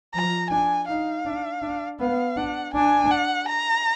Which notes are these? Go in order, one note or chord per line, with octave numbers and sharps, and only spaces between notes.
F3 A#5
D4 G#5
D#4 F5
D4
D4
B3 F5
D4 F#5
D4 G#5
F#5
A#5